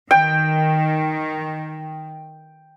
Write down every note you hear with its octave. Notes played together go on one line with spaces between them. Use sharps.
D#3 G5